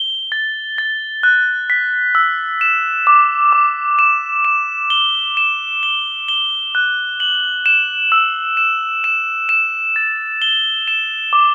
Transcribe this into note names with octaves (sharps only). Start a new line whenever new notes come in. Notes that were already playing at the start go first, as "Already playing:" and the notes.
Already playing: G7
A6
A6
F#6
B6
E6
E7
D6
D6
E7
E7
G7
E7
G7
G7
F#6
F#7
E7
E6
E7
E7
E7
A6
G7
E7
D6